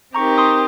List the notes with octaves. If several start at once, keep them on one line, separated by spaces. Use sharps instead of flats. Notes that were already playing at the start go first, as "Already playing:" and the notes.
C4 D#4 G4 A#4 A#5 C#6
C6 D#6